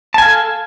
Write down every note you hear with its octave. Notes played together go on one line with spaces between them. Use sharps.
A4 F5 G#5 A5